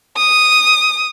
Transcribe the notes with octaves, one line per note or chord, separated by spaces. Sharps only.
D#6